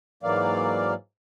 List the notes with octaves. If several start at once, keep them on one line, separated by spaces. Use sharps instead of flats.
G#2 E3 F#3 A#3 D5 F5